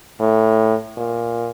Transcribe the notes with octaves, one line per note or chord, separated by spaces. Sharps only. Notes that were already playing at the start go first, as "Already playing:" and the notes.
A2
A#2